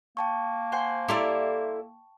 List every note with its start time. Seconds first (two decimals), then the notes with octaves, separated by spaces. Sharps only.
0.17 A#3 G5 A5 C#6
0.72 C5 F#5 G#5
1.08 E4 G4 A4 D5 A#5 C6